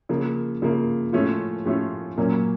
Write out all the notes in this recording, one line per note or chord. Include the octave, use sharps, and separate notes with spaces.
C#3 F3 A#3
C#3 F3 A#3
A2 F3 A3 C#4 F4
A2 F3 A3 C#4 F4
A#2 F#3 A#3 C#4